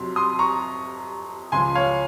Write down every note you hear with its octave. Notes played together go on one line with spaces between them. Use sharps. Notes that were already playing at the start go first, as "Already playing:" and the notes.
Already playing: F2 C3 F#3 C6
C6 D#6
A#5 C#6
C#2 C#3 F3 G#5 C6
C#5 F5